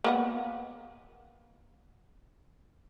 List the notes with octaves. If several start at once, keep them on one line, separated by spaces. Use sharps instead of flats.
A#3 B3 F#5